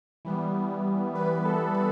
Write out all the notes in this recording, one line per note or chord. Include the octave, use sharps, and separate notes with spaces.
E3 G3 B3
E3 G3 B3 B4
A4
B4